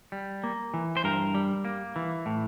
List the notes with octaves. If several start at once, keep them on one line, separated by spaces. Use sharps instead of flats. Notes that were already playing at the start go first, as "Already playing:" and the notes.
G3
A#3
E3
C5
G2 A#4
G3
A#3
E3
A2